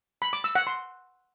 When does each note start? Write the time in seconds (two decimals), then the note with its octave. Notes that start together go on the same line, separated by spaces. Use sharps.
0.22 B5
0.33 D6
0.44 E6
0.55 F#5
0.67 C6